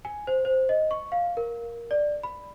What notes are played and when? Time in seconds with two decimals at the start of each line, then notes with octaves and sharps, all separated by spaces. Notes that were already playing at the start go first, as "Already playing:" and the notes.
0.05 G#5
0.27 C5
0.45 C5
0.69 D#5
0.91 C#6
1.12 F5
1.37 A#4
1.91 D5
2.23 B5